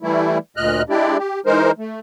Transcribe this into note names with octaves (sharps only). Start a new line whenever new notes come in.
E3 G3 A3 E4
D2 A#2 D#5 F6 F#6
G#3 D4 E4 G4 D5
G4
E3 G#3 D#4 A#4 C5
A3